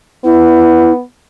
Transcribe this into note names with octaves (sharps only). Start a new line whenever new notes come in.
B3 E4